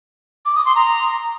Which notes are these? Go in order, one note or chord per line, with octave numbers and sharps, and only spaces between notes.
D6
D#6
C6
A#5